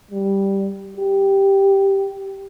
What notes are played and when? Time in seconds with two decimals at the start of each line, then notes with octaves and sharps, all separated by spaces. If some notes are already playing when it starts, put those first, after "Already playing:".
0.11 G3
0.98 G4